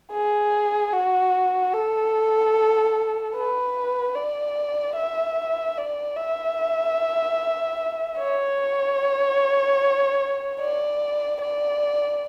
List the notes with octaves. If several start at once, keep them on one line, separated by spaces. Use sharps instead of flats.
G#4
F#4
A4
B4
D5
E5
D5
E5
C#5
D5
D5